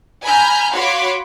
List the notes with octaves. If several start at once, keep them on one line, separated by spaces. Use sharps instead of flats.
G#5 A#5 B5 F6 G6
F#4 C#5 F5 B5 C6 D6